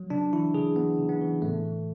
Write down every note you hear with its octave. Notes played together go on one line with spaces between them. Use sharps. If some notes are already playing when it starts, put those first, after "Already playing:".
Already playing: F#3
C#3 D4
E3 E4
C#3 G#4
E3 B3
C#3
B3
E3
A2 A3
E3